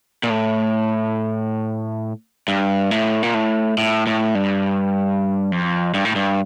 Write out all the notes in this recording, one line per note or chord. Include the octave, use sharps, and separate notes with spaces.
A#2
A2
G2
A2
A#2
A2
A2
A2
G2
F2
G2
A2
G2